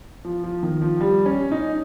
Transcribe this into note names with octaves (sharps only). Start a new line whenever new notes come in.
F3
F3
D#3
F3
G3
C#4
D#4